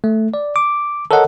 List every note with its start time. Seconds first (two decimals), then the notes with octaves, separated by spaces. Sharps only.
0.04 A3
0.34 D5
0.56 D6
1.11 A4 A#4 C#5 D#5 F#5